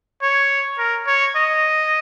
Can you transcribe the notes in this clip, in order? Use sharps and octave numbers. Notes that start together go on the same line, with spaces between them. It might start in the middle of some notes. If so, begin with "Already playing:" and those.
C#5
A#4
C#5
D#5